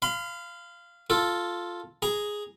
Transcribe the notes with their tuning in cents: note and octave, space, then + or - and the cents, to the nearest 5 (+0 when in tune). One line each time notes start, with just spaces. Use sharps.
F5 -10 B5 +45
F4 +0 A4 +0
G#4 +0 A#5 +0